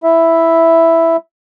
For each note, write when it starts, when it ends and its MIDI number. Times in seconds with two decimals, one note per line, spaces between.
0.04 1.16 64
0.04 1.16 76